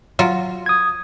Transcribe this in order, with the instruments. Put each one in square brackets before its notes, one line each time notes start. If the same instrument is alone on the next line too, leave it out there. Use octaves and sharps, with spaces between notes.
[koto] F#3 F4
[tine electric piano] D#6 G#6